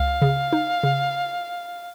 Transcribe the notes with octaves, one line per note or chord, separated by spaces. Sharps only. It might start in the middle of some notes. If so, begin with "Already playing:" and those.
Already playing: C#2 F5
C#3
D#4
C#3